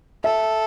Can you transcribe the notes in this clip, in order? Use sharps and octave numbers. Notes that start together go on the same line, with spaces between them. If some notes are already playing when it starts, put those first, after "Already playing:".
A4 E5